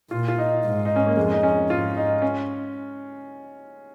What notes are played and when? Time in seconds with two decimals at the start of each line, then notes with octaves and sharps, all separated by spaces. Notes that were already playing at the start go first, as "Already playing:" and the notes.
0.11 A#2 F4
0.28 F4
0.38 D#4
0.64 G#2
0.85 D#4
0.96 C#4
1.07 A#3
1.17 F2 G#3
1.31 D#4
1.43 C#4
1.69 G#2 F4
1.97 D#4
2.22 C#4